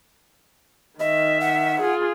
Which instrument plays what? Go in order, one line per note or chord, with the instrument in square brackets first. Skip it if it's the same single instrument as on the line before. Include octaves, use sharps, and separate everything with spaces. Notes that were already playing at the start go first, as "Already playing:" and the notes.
[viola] D#3 E5 [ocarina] D#5
[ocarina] F#5
[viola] F4 G#4